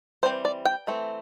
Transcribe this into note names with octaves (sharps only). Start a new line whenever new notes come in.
E3 G3 C4 C5
D5
G5
E3 A3 C4